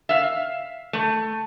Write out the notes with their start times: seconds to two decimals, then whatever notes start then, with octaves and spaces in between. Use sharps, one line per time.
0.09 E5 F5
0.93 A3